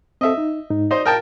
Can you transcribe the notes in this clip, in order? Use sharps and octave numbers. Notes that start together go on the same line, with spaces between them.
C4 A4 D#5 E5
D#4
G#2 D#4
D#4 C5 D5
A#4 G5 A5